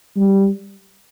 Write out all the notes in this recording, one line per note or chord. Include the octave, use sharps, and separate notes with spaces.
G3